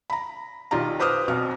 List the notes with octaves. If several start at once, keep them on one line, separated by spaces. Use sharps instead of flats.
A#5 B5
B1 D#3 F4 G4 D5 A#5
B4 C5 D6 D#6 F6
B1 B2 C4 F6